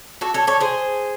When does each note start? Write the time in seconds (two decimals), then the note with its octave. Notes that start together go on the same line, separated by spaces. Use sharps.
0.21 F#4 A4
0.34 A4 C#5
0.47 A4 C#5
0.61 G#4 C5